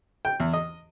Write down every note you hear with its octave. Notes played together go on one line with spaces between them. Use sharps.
G5
E2
D#5